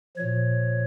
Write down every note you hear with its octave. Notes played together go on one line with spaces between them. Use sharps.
A#2 F3 C#5